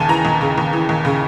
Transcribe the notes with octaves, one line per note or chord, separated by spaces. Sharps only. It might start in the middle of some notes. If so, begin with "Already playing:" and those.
Already playing: D#2 C#3 G#5 A5
E3 A#5
D#2
C#3
D#2
E3
D#2
C#3